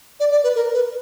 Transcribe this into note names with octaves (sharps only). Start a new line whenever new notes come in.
D5
D5
B4
A#4
B4